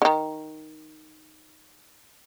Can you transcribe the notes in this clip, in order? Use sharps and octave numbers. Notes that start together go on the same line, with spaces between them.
D3 D#3